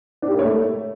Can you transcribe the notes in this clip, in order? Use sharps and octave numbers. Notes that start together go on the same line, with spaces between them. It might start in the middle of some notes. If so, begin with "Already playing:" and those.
D4
G4
A#3
C#5
A3